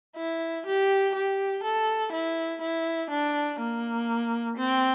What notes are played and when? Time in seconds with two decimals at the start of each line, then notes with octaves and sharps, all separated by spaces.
0.16 E4
0.66 G4
1.15 G4
1.63 A4
2.13 E4
2.61 E4
3.11 D4
3.60 A#3
4.57 C4